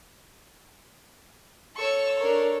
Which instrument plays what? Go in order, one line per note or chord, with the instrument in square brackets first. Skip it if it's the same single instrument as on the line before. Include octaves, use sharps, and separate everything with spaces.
[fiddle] A4 C#5 [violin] C#6 E6
[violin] D4 A#4